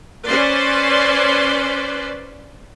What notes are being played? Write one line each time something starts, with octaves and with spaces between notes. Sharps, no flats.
C#4 B4 C5 D5 C6